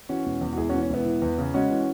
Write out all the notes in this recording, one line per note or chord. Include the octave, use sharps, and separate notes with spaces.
E3 C#4 F#4
E1
E2
F#4
E1 E4 G#4
C#4 F#4
E3
C#4
E1 B3 E4
E3
E2
C#3
G#3 C#4 F#4
E3